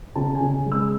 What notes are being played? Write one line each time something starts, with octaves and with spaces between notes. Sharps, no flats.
C#3 A5
G#5
C#3
G#3
E6